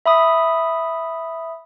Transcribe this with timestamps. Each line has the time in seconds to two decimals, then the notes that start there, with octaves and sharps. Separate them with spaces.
0.06 E5 B5 D#6